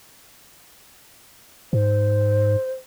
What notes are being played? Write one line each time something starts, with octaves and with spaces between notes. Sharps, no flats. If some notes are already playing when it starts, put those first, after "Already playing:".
G#2 C5